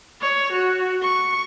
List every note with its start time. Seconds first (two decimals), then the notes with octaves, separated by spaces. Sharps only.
0.21 C#5
0.53 F#4
1.02 C#6